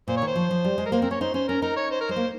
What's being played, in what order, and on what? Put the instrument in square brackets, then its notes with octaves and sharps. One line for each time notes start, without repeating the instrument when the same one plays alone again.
[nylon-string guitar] A#2 [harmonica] C5
[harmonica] C#5
[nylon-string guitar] D#3
[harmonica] C5
[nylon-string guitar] F3
F3
G3
G#3
[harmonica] A#4
[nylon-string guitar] A#3 [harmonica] C5
[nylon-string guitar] C4 [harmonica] A#4
[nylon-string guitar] C#4 [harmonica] C#5
[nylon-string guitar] D#4 [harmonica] C5
[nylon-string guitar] C#4 [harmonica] C5
[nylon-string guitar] C#4 [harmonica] A#4
[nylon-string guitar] D#4 [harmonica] A#4
[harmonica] C#5
C5
A#4
[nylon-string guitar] G#3 [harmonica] C5
[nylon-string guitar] A#3